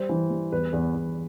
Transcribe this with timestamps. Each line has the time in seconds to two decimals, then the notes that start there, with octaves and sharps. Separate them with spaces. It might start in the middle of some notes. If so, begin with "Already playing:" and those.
Already playing: G3 C5
0.09 E3
0.30 G3
0.52 E2 B4
0.73 E2
0.95 E2